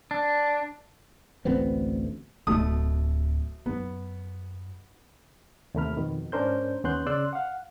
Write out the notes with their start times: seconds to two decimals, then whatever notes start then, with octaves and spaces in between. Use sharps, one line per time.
0.11 D4
1.45 A1 D2 B3 C4
2.47 D1 B2 A3 D#6
3.66 F#2 B3
5.75 D#2 C3 A3 A#4 B5 F6
5.97 F2 B2 D#3
6.32 G#2 C#4 D4 A#4 C5 G6
6.84 D#2 B3 C#4 C6 F#6 G6
7.07 C#3 D5 C6 E6 F#6
7.33 F5 F#5